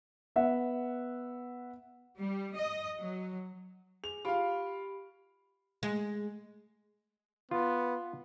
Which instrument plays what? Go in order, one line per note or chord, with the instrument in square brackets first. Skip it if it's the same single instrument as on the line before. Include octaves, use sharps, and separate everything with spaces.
[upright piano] B3 E5 F#5
[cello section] G3
D#5
F#3
[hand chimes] G#4 [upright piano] F7
[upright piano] F4 F5 [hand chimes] G4 B5 D7
[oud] G#3
[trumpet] B3 [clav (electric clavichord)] F4